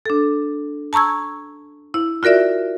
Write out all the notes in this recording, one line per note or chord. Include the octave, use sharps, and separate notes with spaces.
D4 A4
A5 A#5 C#6 E6 G#6
E4
F4 F#4 A#4 D5 E5